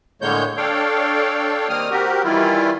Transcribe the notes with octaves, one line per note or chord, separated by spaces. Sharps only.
A2 D3 G#3 A#3 C#5 G6
D4 A4 C#5 F5 G5
D#3 G3 A#3 C4 D#6 F6
C4 F#4 G4 A#4
D#3 E3 G3 E4 F4